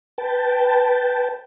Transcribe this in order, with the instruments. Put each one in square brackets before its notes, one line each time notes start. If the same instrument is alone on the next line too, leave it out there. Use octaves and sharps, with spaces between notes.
[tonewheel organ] B4 G5 A5